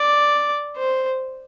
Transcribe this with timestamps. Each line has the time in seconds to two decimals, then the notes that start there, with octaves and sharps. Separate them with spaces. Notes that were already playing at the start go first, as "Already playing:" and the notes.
Already playing: D5
0.77 C5